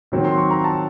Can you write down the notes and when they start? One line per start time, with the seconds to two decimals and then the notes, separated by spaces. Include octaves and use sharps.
0.12 D#3 F#3 C4
0.25 C6
0.38 C#6
0.50 A#5
0.64 A5